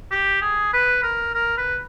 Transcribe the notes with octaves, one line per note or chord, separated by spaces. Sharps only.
G4
G#4
B4
A#4
A#4
B4